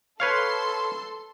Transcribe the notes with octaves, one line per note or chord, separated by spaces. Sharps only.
A4 B4 C#5 F5 C6